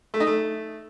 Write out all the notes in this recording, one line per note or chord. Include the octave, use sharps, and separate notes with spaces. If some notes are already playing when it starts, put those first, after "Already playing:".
A3
D#4
A3